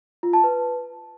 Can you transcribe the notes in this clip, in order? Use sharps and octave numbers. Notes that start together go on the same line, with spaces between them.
F4
A5
B4